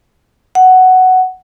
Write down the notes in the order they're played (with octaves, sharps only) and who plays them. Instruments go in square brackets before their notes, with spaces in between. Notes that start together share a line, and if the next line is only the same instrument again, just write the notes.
[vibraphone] F#5